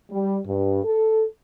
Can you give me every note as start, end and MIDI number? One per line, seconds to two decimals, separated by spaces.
0.12 0.38 55
0.47 0.83 43
0.84 1.24 69